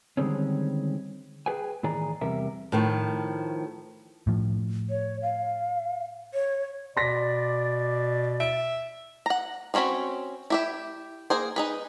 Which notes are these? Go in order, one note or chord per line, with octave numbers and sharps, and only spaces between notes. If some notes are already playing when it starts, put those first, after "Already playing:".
D3 D#3 G3 G#3 C4 C#4
G#4 B4 G5 G#5
A2 D#3 E3 G#4 D5 A#5
E2 C3 G3 A#4 E5
A2 D#3 F3
A2 F3
C#5
F5
C#5
B2 D5 C6 A#6 B6
E5 D7
F#5 A#5
F3 C4 C#4 F#4 B5
E4 G4 E5
A#3 G#4 C5
D#4 G#4 B4